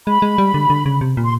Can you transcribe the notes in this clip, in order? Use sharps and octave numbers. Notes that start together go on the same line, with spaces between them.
G#3 B5
G#3
G3
D3
D3
C#3
C3
A#2
C6